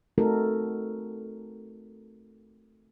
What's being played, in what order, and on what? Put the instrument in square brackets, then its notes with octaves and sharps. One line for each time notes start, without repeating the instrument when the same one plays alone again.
[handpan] A3 C4 D#4 F#4 A4 A#4